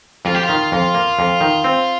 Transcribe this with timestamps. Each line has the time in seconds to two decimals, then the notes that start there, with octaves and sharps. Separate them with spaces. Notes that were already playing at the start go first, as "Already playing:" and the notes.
0.25 F2 F4
0.35 G4
0.43 F4
0.49 D#3
0.72 F2
0.94 A#3
1.19 F2
1.41 D#3
1.64 C4